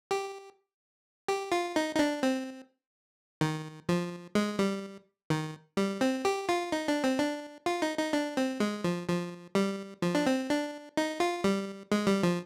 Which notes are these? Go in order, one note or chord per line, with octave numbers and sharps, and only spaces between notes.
G4
G4
F4
D#4
D#4
D4
C4
D#3
F3
G#3
G3
D#3
G3
C4
G4
F4
D#4
D4
C4
D4
F4
D#4
D#4
D4
C4
G#3
F3
F3
G3
F3
D4
C4
D4
D#4
F4
G3
G#3
G3
F3